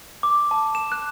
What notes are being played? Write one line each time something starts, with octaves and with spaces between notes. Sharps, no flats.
D6
A5
E7
F#6